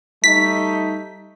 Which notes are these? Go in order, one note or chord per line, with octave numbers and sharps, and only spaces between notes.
G3 A3 D#4 B6